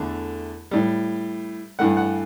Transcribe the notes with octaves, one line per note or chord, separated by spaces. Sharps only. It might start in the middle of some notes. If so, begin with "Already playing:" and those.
Already playing: E2 D3 A3
A2 G3
G2 E3 A3 F#5
F#5